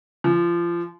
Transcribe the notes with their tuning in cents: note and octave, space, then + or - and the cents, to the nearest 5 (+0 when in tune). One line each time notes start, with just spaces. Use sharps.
F3 -25